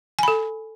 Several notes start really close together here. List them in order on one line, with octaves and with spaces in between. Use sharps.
G#5 B5 A4